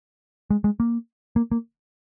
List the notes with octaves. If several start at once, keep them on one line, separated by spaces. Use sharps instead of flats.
G#3
G#3
A#3
A#3
A#3